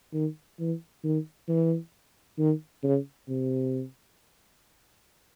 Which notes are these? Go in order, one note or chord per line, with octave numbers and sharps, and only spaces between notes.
D#3
E3
D#3
E3
D#3
C#3
C3